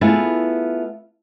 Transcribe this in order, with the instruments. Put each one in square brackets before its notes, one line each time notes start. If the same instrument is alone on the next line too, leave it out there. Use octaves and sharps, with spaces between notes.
[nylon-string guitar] A3 B3 E4 F4 G#4 B4